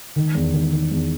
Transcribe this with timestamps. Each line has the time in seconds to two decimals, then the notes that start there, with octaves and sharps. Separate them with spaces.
0.16 D#3
0.35 E2
0.53 D#3
0.72 D#3
0.91 E2